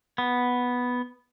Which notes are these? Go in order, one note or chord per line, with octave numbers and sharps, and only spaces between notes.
B3